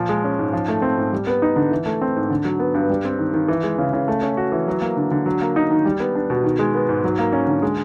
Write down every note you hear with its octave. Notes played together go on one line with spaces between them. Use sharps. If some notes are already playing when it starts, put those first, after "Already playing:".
Already playing: A#2 F3
G#3
C#4
G#2
F3
A3
C4
G#2
G3
B3
D#4
D3
E3
A3
C4
G#2
D3
F#3
B3
G2
G3
C4
D#3
D#3
E3
G#3
C#3
C#3
A3
C#4
F#4
E3
F#3
A#3
D3
D3
F#3
A#3
D#4
D#3
G3
B3
D4
B2
D#3
G#3
B3
G#2
F#3
A#3
C#4
D3
G#3